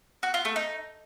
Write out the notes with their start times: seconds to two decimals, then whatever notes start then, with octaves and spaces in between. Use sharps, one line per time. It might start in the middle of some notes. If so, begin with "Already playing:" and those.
0.23 F#4
0.34 F4
0.45 A3
0.56 D#4